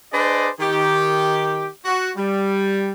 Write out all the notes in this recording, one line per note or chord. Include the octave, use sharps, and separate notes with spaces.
D4 G#4 B4 C5 D5 D#5
D#3 G4
F#4
G3